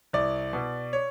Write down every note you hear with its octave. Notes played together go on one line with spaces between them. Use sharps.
C2 D5
B2
C#5